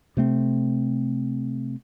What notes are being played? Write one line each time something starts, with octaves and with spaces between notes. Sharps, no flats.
C3 A3 C4